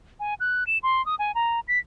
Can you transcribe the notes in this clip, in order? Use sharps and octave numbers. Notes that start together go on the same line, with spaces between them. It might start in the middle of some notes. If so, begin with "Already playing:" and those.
G#5
F#6
E7
C6
D#6
G#5
A#5
B6